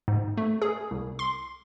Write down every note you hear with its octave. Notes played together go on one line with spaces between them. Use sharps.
G#2
A3
G#4
C2
C6